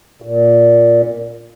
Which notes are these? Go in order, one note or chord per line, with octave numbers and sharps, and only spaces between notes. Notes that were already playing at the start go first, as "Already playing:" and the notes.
A#2